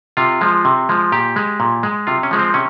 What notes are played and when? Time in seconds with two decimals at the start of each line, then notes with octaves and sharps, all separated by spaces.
0.17 C3 F4
0.41 F3 G#3
0.65 C3
0.89 F3 G#3
1.12 A#2 G4
1.36 G#3
1.60 A#2
1.83 G#3
2.07 C3 F4
2.23 C#4
2.31 F3 G#3
2.39 C4
2.54 C3 C#4